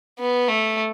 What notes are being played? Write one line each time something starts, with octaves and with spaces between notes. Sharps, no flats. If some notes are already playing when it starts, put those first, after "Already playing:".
B3
A3